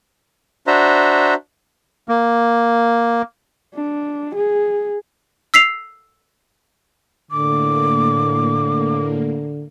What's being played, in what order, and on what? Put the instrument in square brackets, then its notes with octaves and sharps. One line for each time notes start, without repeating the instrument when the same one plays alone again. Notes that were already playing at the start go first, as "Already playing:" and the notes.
[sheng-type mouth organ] D4 F#4 C5 E5 A#5
[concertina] A#3
[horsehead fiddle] D4
G#4
[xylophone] E6 B6 C7 F7
[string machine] A2 A#3 [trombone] D3 [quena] D6